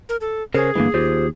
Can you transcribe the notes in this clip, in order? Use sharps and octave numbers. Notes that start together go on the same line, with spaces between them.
A#4
A4
C#3 C#4 G#4 A#4 C5
G2 D3 E3 G#3 A#3
D#2 F4 G4 C5